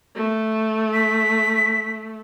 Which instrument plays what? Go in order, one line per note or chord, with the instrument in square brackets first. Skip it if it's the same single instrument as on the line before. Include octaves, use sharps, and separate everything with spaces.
[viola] A3
[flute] B6